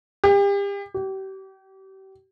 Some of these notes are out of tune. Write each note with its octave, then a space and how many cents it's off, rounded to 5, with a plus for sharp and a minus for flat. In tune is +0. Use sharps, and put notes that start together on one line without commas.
G4 +35
G4 -35